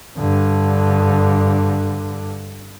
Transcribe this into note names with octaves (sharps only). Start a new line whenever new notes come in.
G2 D3